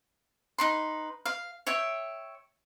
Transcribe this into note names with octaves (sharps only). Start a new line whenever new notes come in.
D#4 B4 C6
F5
C#5 E5 G5